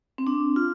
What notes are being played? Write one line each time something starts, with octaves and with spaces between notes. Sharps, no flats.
C4
D4
F4